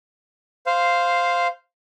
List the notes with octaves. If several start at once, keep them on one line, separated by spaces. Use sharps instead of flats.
C5 F5